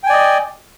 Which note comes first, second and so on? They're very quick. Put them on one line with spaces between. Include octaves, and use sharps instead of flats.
G5 G#5 D5 D#5